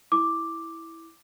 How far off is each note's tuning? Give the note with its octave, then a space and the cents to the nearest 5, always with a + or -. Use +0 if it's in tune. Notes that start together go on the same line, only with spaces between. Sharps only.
E4 -5 D6 +0